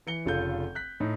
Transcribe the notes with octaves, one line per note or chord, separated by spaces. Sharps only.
E3 C#7 G7
F1 C#3 F4 A4 G6
F#6 B6
A2 D#4